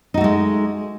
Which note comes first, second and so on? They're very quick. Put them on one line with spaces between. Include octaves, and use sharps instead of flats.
D#4 F#4 A3 G#3